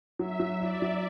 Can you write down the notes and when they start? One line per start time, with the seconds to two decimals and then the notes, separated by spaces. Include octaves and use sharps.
0.19 F#3 E5
0.40 F#3
0.60 E4 D5
0.82 F#3